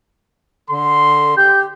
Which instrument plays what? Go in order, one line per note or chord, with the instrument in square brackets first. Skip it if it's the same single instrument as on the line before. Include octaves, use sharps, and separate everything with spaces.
[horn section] D3 A4 C6
[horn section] G4 [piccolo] G6